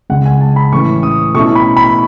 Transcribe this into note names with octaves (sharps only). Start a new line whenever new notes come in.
C#2 C#3 G#3 F#5
G#5
A5
B5
A2 E3 A3 C#4 E4 C#6
D#6
B2 A3 C#4 E4 C#6
B5
B5